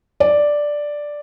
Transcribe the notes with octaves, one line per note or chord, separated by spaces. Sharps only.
D5